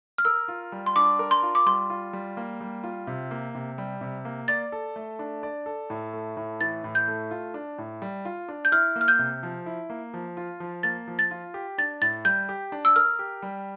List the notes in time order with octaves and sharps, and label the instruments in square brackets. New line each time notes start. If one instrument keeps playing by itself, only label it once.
[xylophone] F6
[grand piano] A#4 [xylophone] E6
[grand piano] F4
G3
[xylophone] C6
[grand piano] D4 [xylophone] D6
[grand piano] A#4
[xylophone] C6
[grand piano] F4
[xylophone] D6
[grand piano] G3 [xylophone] C6
[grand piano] F4
G3
A#3
G3
F4
C3
A#3
C3
G3
C3
A#3
[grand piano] D5 [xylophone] A6
[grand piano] A4
A3
D4
D5
A4
A2
A3
A2
[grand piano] E3 [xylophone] A6
[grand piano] A2
[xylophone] G6
[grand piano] A3
F4
D4
A2
G3
F4
D4
[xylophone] G6
[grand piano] E4 [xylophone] F6
[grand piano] A#3
[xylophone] F6
G6
[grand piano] C3
F3
E4
A#3
F3
F4
F3
[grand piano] A#3 [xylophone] A6
[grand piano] F3
[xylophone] A6
[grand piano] F4
G4
[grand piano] D4 [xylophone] A6
[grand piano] A2 [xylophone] A6
[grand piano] G3 [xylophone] G6
[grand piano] G4
D4
[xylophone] E6
[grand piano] A#4 [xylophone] F6
[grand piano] G4
G3